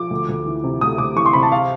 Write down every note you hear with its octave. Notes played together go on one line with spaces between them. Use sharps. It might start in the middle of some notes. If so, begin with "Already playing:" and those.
Already playing: F3 D6
D2
D2
E3
C3
D2 D#6
D2 D6
E3 C#6
C6
C3 B5
A5
F5